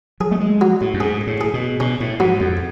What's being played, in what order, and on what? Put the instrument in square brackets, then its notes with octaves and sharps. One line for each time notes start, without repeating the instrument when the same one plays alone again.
[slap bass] F#3 [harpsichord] G#4
[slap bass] A3
G#3
[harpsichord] F#3
[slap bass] A2
F#2
[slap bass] G#2 [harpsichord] G#4
[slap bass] A2
[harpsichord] G#4
[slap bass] B2
[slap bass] B2 [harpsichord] C#4
[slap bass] A2
[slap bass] G#2 [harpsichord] F#3
[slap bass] F2